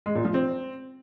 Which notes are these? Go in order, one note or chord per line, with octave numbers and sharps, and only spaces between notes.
G#3
A#2
F3
C4